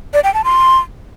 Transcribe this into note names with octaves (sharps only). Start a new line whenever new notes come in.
D5
G5
A5
C6